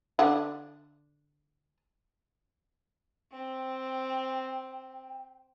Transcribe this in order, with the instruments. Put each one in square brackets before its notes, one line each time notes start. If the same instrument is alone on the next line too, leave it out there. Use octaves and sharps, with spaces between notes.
[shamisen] D3 D4 F#5
[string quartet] C4 [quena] G5